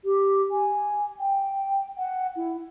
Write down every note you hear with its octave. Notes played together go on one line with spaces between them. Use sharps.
G4
G#5
G5
F#5
E4